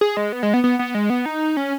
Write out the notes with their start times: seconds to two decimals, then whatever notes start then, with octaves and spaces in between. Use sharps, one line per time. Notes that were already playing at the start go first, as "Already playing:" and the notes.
0.01 G#4
0.17 G#3
0.32 B3
0.43 G#3
0.54 B3
0.64 B3
0.79 B3
0.95 G#3
1.10 B3
1.26 D#4
1.57 C#4